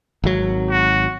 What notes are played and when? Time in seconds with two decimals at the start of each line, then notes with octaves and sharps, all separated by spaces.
0.24 G#1 F#3
0.70 F#4